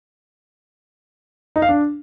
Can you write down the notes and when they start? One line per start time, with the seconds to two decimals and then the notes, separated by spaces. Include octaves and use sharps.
1.56 D#4
1.62 F5
1.69 D4